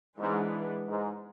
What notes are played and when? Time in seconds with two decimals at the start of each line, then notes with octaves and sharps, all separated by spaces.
0.19 G#2 E3 G#3 B3 D4
0.88 G#2